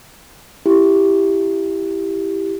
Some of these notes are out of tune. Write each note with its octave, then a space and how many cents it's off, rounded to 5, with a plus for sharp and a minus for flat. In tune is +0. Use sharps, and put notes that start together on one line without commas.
E4 +10 G4 +0